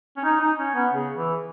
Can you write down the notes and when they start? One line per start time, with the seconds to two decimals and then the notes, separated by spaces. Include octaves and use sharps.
0.17 C#4
0.24 D#4
0.40 D#4
0.58 C#4
0.75 B3
0.93 C#3
1.17 E3